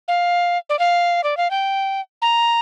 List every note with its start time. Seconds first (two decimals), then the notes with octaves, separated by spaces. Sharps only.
0.08 F5
0.69 D5
0.79 F5
1.24 D5
1.37 F5
1.51 G5
2.22 A#5